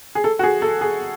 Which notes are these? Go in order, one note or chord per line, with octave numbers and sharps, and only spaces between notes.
G#4
A4
F#4
G#4
A4
G#4